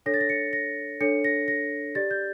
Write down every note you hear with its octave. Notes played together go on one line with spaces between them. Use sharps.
D4 A4 C#5 A#6
A6
A#6
C#7
A#6
D4 A4 C#5 C#7
A#6
A#6
G4 D5 A6
G6